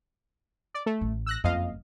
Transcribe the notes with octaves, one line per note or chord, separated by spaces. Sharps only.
D5
A3
A1
E6 F#6 A#6
F#1 F2 D#5 F5